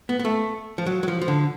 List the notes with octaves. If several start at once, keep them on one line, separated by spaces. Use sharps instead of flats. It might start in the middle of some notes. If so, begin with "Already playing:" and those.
B3
B3
A3
F3
F#3
F#3
F3
F3
D3